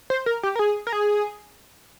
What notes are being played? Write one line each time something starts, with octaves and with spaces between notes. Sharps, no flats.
C5
A#4
G4
A#4
G#4
A#4
G#4